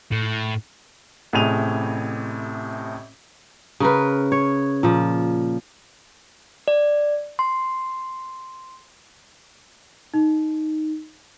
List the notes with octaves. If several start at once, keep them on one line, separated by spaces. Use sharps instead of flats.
A2
A1 A2 C3 G#4 D#7 F7
C#3 A#4 B4
C#5
A#2 F3
D5
C6
D#4